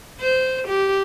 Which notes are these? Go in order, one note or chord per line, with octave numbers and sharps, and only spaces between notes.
C5
G4